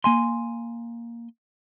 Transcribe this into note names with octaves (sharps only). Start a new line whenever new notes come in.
A#3 G#5 C6